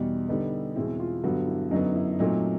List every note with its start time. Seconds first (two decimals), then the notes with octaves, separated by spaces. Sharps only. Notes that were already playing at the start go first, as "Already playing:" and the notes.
Already playing: E2 B2 G3 D#4
0.28 D3 G3 B3 D#4
0.76 E2 B2 G#3 C4 E4
1.00 F4
1.24 G2 D3 F#3 B3 F#4
1.48 E4
1.71 F#2 D3 F#3 B3 D#4
1.95 E4
2.19 A#2 F#3 A3 C4 D#4